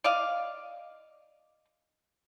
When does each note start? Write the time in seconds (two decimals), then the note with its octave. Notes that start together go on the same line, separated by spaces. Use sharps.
0.04 D5 D#5 F5